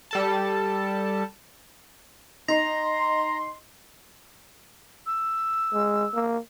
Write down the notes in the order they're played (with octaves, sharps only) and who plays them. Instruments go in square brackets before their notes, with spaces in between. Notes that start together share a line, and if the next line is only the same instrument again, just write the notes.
[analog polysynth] G3 A4 A5
[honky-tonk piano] D#4 [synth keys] A#5 [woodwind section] C6
[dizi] E6
[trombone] G#3
A#3